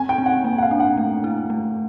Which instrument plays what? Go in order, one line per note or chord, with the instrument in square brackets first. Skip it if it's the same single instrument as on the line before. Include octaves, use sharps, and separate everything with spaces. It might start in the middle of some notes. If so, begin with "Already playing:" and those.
Already playing: [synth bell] C4 [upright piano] G#5
[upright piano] G5
[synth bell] C4
[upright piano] F#5
[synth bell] A#3
[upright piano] F#5
F5
[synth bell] D4
[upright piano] F#5
[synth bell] A3
E4
A3